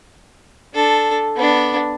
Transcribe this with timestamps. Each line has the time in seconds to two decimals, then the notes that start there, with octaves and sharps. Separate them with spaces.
0.74 D4 A4
1.36 B3 D4